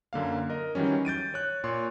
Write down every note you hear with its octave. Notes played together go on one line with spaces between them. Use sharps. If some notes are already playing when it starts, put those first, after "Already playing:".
F#2 D3 A#3 F5
A#4 D#5
D#3 E3 F#3 G3 C#4
G6 A6 D7 D#7
C#5 F#6
A#2 C#5 C6 C#6